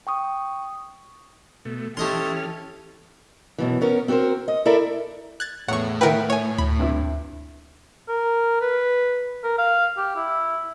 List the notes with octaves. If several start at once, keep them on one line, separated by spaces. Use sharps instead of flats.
G5 C#6 D#6
B2 A3
E3 A3 C#4 G4 A4 D#5 C6 F6
F#2 B2 E3
B3 C#4 A#4
C4 F#4 A4 A#4 C5
D#5
E4 A4 A#4 D5 E5
F#6 G#6 A6
E2 A2 C#5 F#5 C#6
D#3 E4 A#4 B4 F#5 G5
C#5 G#5
D2 B5
G2 C3 E4
A#4
B4
A#4
F5
G4
E4